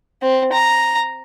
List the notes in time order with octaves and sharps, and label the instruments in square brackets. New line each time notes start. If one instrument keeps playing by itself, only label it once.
[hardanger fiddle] C4
A#5